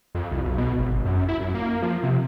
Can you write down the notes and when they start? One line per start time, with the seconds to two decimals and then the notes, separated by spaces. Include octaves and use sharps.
0.15 F2
0.31 C2
0.44 B1
0.58 B2
0.78 G#1
0.92 G#1
1.05 F#2
1.28 E4
1.41 F#2
1.54 A#3
1.82 F3
2.03 C3